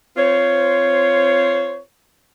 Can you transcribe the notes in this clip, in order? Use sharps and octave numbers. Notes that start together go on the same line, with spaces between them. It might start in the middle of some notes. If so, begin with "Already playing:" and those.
C4 F4 C5 C#5